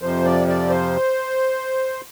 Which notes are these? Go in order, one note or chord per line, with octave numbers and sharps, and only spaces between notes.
F2 C3 F3 C5
D5
D5
C5